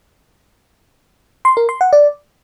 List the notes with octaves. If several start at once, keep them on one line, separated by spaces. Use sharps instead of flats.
C6
A#4
C6
F#5
D5